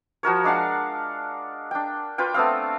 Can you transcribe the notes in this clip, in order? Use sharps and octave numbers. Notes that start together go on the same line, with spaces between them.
F3 F#4 A#4 C#5
G#3 D4 F5 F#5
D4 G5
F4 B4 G5
A3 B3 C4 F5